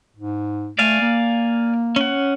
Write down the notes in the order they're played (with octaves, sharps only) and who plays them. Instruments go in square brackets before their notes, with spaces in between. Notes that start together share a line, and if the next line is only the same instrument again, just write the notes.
[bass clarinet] G#2
[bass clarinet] A3 [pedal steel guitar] D5 F5 G#5
[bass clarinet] A#3
[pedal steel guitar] C#4 F#5